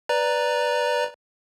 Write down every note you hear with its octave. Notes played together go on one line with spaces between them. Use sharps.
B4 D5 A#5